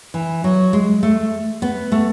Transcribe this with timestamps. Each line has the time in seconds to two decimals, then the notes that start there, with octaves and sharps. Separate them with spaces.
0.14 E3
0.44 F#3
0.73 G#3
1.03 A3
1.62 B3
1.92 A3